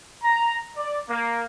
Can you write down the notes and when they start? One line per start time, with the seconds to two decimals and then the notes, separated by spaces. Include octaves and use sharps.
0.23 A#5
0.77 D5
1.09 A#3